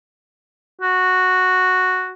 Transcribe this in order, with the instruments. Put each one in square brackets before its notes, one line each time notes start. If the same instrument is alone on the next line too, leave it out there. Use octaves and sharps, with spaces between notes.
[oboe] F#4